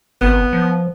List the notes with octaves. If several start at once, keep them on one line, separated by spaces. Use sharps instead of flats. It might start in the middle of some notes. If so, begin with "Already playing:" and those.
G#1 B3
F3